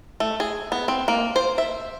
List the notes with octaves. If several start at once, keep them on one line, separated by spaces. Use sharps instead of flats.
A3
G#4
B3
C4
A#3
C5
E5